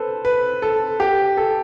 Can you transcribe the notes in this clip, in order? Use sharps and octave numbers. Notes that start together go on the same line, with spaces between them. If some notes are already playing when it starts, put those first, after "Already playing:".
Already playing: A4 B4 C5
B4
A4
G4
A4